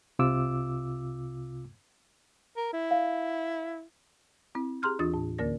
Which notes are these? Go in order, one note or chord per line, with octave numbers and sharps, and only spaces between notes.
C2 C3 F4 D6 E6
A#4
E4
F5
C4 E4
G4 G#4 A#5 C6 F6 G6
D#2 E3 D4 F4 D#6 A6
A2
D2 D3 A#3 A#4 D5 A#6